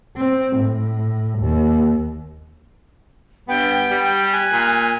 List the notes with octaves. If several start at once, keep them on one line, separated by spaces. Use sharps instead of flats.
C4
A2
D#2
G2 B3 G5
G3
G#5 F#6
A#2